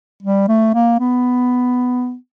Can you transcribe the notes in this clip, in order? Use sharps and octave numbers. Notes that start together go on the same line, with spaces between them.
G3
A3
A#3
B3